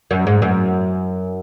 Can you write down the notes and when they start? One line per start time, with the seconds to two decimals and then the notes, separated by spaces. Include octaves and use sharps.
0.11 F#2
0.27 G#2
0.42 F#2